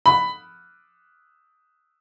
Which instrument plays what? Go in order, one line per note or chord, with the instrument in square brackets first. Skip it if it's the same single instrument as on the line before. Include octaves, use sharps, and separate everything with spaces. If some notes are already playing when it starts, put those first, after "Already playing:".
[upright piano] B5